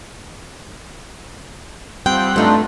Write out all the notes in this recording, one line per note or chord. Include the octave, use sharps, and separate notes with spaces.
F3 G3 C4 F#5 G5
G2 A3 D4 D#4 F4